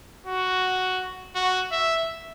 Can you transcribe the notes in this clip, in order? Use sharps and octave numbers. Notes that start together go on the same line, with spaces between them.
F#4
F#4
E5